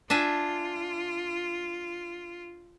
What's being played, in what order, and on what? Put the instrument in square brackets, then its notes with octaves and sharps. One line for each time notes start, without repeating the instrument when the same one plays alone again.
[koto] D4 E5 G#5 [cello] F4